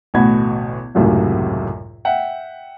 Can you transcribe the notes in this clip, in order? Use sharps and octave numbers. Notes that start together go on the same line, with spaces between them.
A1 D2 B2 F#4 B5 G#6
G#1 C#2 F#2 A2 C3 F#3
E5 F#5 G5